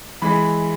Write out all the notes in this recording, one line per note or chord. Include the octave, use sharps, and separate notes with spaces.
E3 G#3 B5